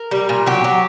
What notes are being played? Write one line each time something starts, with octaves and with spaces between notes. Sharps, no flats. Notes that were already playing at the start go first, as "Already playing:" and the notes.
Already playing: A#4
G3
A#2
F#3 G4
F#3